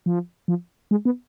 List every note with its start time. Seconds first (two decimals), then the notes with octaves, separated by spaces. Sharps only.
0.06 F3
0.48 F3
0.91 G#3
1.05 B3